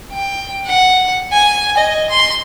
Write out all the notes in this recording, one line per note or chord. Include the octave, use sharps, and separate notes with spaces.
G5
F#5
G#5
D#5
C6